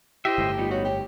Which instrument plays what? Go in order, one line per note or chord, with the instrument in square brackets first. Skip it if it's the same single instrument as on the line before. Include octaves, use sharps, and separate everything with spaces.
[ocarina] E4 [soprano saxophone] G4 [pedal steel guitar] C5 D#5 E5
[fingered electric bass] G1 A2
[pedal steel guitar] G3 B3 D#4 [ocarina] F4
[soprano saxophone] F#4 [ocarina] C#5
[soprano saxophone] G4